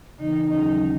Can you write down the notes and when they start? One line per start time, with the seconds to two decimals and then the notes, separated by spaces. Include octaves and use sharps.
0.19 C#3 E3 B3 D#4
0.49 D#2 D#3 F#3 C#4 D#4 G#4
0.81 D#3 F#3 C#4